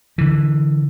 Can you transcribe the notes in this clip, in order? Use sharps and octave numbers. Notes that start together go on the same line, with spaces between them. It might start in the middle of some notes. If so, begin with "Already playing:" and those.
D3 E3